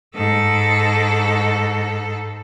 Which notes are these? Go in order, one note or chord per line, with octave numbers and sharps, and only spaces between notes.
G#2 A4